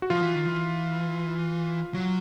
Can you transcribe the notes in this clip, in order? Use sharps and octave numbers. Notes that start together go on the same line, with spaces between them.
F#4
F3 F4
E3
D#3
E3
F#3